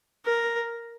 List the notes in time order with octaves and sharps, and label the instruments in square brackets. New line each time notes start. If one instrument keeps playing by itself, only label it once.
[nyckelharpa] A#4